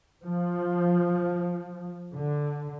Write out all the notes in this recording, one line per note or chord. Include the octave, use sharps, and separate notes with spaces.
F3
D3